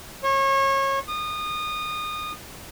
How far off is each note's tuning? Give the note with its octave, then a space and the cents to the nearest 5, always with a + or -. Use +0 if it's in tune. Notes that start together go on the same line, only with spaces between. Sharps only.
C#5 -30
D#6 -25